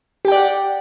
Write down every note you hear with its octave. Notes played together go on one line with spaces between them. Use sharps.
G4 D5 F#5 G5